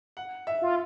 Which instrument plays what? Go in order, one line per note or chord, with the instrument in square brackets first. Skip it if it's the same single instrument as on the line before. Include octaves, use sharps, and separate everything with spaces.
[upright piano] F#5
E5
[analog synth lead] F4